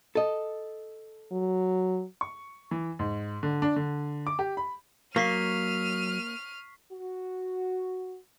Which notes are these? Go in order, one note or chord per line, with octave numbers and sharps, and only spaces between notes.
A4 D#5
F#3
C#6
E3
G#2
D3
D4
D3
D6
G4
B5
F#3 A#3 C#6 F6 B6 C7 D#7
F#4